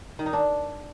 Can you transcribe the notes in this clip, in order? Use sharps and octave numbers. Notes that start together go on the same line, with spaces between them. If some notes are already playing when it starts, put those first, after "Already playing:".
D#3
D#4
D4